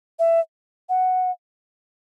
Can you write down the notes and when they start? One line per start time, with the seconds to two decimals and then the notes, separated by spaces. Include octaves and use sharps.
0.19 E5
0.89 F#5